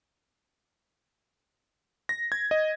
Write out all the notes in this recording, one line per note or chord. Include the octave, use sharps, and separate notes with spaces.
A#6
G#6
D#5